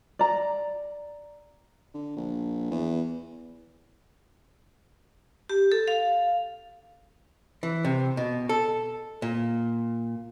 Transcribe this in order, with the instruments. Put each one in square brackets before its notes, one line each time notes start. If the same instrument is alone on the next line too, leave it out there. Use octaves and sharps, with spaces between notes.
[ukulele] D5 A#5
[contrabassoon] D3
A#1
E2
[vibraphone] G4
A4
F5
[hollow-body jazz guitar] E3
C3
B2
A4
A#2